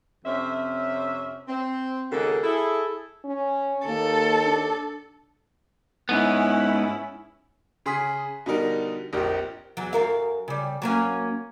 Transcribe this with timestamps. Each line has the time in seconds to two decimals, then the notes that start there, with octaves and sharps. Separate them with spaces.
0.25 F2 C3 C#4 C5 E5
1.48 C4
2.11 D#2 C#3 G#3 A#3 F#4 A4
2.44 E4 G#4 A4
3.25 C#4
3.86 D#2 A#3 A4
4.45 D4
6.09 G#2 B3 C#4 E4
7.86 C#3 G#4 C6 D#6 B6
8.46 B2 D3 G3 D#4 A#4
9.13 A#1 F2 G4 A#4
9.77 E2 F#3
9.93 F#2 A#4 F5
10.48 C#3 G3
10.82 F#3 A#3 C#4